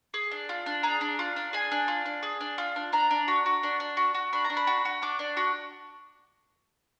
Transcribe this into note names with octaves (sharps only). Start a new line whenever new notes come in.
G#4
D4
F4
D4
G#4 A#5
D4
F4
D4
G#4 G#5
D4
F4
D4
G#4
D4
F4
D4
D4 A#5
D4
F#4
F#4
D4
D4
F#4
F#4
D4 B5
A#5
D4
B5
F#4
F#4
D4 D6
D4
F#4